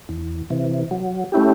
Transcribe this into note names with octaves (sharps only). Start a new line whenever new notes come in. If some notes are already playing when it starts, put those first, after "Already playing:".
E2
C3 E3
F#3
A3 C#4 E4 G4